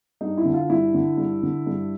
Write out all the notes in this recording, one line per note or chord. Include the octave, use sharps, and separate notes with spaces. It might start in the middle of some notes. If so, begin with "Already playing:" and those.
G2 D#4
E4
D3
F4
G2 E4
D3
G2
D3
G2